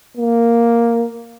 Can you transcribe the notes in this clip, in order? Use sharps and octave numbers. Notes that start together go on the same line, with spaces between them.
A#3